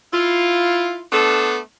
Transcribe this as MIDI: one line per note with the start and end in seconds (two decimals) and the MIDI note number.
0.13 1.02 64
0.13 1.02 65
1.12 1.58 57
1.12 1.58 59
1.12 1.58 62
1.12 1.58 69